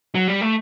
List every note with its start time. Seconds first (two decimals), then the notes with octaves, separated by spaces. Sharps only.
0.15 F#3
0.28 G3
0.41 A3